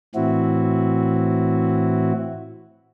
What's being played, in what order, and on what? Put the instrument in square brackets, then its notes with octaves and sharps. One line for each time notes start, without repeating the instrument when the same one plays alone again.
[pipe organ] A2 E3 C4 E4 F#4